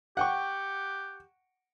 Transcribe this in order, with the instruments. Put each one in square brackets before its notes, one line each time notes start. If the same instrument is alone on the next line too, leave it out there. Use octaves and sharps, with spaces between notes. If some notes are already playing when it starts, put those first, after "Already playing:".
[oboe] G4 [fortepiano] F#5 G5 C#6